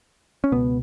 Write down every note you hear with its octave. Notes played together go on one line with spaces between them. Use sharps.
C#4
C#2 B2 B3